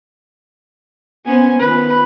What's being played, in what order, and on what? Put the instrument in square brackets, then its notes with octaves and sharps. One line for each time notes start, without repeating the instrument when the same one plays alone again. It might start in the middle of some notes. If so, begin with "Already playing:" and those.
[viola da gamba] B3 C#4 C5 [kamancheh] G#5
[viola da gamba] D#3 B3 F4 [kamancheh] B4